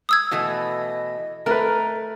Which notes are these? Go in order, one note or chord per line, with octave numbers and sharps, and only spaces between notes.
D#6 E6 G#6
B2 E3 A3 D#5
A3 A#4 B4 A#5